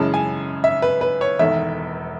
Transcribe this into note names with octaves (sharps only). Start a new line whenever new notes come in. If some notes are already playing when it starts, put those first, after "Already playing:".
Already playing: F#2 C#3 E3 G#3 A5
G#5
E5
B4
B4
C#5
E1 E2 D#3 A3 E5